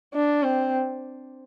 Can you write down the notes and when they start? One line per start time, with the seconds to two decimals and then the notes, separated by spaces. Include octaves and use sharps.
0.14 D4
0.43 C4